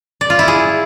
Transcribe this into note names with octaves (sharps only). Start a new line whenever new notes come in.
D5
F4
E4
G#4